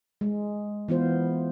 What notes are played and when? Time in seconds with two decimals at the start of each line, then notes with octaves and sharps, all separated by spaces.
0.21 G#3
0.88 E3 B3 F4 C5